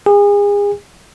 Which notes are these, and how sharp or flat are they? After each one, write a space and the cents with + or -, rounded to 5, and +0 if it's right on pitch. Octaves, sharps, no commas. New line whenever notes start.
G#4 -35